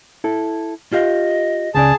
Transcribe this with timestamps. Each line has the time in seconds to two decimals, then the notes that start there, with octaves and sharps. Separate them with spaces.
0.24 E4 A4
0.93 F4 G4 D#5 F5
1.75 C#2 C#3 G#4 D5 A5